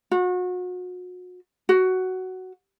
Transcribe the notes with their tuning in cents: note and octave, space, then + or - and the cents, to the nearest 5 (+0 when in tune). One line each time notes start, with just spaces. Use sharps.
F#4 -35
F#4 +10